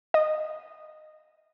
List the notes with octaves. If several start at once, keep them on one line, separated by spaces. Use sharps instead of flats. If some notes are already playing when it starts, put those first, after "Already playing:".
D#5